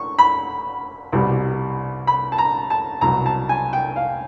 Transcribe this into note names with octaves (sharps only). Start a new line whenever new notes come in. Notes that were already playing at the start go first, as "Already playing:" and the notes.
Already playing: C#6
B5
C2 B2 G3
B5
A5
A#5
A5
C2 B2 F#3 A#5
A5
G#5
G5
F5